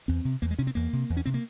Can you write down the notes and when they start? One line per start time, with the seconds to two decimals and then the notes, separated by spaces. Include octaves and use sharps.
0.08 E2 C4
0.25 C3
0.42 E2 A#3
0.51 G#3
0.58 C3 C#4
0.67 C4
0.75 E2 A#3
0.93 C3
1.10 E2
1.17 C#4
1.25 C3 C4
1.34 A#3